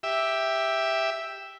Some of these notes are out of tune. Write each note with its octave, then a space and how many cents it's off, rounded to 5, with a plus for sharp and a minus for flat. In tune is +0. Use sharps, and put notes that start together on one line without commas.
G4 +5 E5 +0